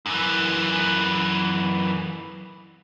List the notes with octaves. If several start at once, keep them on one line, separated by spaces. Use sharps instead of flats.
F#2 E3